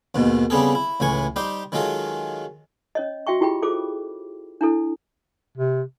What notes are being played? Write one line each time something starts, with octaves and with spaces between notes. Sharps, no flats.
D#2 G#2 B2 D#3
C#3 G3 B3 C4 G#4 A4
E4
C#2 A2 E3 G#5 C#6
G3 D#4 G4 C5
D#3 F#3 G#3 F4 A4
C#4 C#5 D#5
F#4 E5 G5 C#6
E4 F4 G4 G#4 G5 B5
F4 G#4 A4 C5 D6
D4 E4 A4
C3